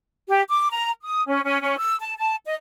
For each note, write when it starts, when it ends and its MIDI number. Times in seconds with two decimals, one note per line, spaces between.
0.29 0.42 67
0.49 0.68 86
0.71 0.90 82
1.02 1.23 87
1.27 1.41 61
1.44 1.61 61
1.61 1.76 61
1.78 1.94 88
2.01 2.14 81
2.18 2.36 81
2.45 2.55 75